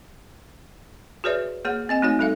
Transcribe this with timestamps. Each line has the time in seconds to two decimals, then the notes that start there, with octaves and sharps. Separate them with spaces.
1.24 F#4 G#4 B4 C#5 D5 E5
1.65 A#3 G#4 C#5 F#5
1.89 C4 D#5 G#5
2.02 A3 D#4 F#4 C#5 G#5
2.19 G3 D#4 A4 E5 F5